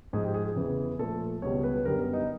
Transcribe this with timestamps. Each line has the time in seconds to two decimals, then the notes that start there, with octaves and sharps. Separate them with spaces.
0.13 G#2 F3 G#3 G#4
0.24 G4
0.34 G#4
0.45 G#4
0.56 E2 C#3 E3
0.99 A#2 F3 A3 A4
1.42 C#2 B2 G3 C#5
1.63 B4
1.85 F#2 D3 G3 B3 A#4
2.13 D#4